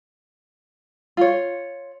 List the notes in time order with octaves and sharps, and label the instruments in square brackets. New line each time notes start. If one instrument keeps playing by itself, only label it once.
[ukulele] F4 C#5